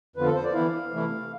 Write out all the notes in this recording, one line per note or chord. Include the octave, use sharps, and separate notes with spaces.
F2 D3 F3 B3 F4 B4
A4
C5
D5
E3 B3 E4 F5
C3 E3 A3 E4